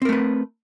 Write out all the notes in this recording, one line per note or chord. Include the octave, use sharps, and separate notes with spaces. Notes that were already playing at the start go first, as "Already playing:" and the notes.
A3 C4 A#4 B4